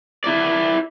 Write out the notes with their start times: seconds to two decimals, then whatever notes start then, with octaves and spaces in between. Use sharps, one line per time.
0.24 E4 D5